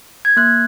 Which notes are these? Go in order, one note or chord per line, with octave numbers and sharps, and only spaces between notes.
G#6
A#3 F#6